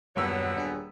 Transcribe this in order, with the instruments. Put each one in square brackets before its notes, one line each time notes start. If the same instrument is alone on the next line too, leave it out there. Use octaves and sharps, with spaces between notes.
[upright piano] D#1 C#5 E6 [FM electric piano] F#2 [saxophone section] D3 F#3 [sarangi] B3
[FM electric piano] D4 G#4